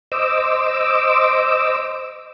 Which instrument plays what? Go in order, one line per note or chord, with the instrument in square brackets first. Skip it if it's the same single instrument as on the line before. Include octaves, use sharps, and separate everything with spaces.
[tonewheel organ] C5 D#5 D6 E6